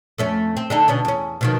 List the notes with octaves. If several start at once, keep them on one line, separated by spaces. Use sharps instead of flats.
F2 A3 C#4
C4
D3 D#4 A4
B2 D3 C#4
E2 C#4
B2 D#3 F3